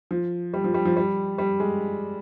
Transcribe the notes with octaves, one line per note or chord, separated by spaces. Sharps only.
F3
G3
F3
G3
F3
G3
G3
G#3